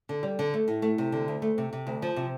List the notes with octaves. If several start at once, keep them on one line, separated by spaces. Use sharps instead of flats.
D3
G3
D3
A3
A2
A3
C3
D3
D2
A3
C3
C3
D2
F3
C3